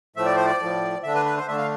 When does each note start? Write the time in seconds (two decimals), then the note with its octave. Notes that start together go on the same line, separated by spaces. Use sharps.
0.16 A2 F3 A3 E5
0.26 D5
0.36 C5
0.46 D5
0.60 A2 F3 A3
1.03 D3 A3 D4 E5
1.15 B4
1.26 B4
1.37 C5
1.48 D3 A3 D4 E5
1.57 F5